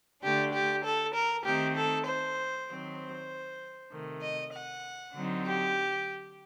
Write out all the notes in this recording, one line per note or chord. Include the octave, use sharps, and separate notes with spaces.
D3 A3 D4 G4
G4
A4
A#4
D#3 A3 C4 D#4 G4
A4
C5
D#3 F#3 C4
C5
C3 D#3 A3
D#5
F#5
D3 F#3 C4 D#4
G4